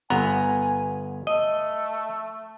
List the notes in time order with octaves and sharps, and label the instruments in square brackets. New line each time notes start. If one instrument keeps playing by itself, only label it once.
[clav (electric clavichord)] G1 B3 A#5 [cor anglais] G#5
[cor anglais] A3 [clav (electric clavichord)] D#5